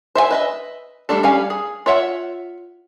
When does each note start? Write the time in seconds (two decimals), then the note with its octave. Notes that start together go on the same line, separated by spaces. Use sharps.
0.15 C5 E5 F5 G#5
0.31 B4 D#5 E5
1.09 G3 A3 D4 A4
1.23 G3 C#4 F5 G#5
1.50 G#4
1.86 F4 C#5 E5 F#5